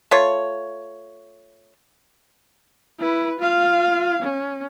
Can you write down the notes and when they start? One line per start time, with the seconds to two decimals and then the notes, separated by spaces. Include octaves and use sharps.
0.11 A3 F4 C#5
3.00 E4 B4
3.40 F4 F5
4.23 C#4